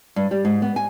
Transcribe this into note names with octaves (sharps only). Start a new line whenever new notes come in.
G2
G3
G#2
B3
G#5